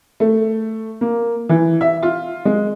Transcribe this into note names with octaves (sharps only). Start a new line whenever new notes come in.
A3
A#3
E3
E5
F4
G#3